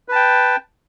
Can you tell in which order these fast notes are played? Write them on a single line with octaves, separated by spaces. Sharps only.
B4 A5 G5